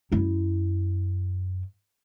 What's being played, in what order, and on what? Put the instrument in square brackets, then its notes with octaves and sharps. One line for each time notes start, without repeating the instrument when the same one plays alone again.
[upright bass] F#2 E4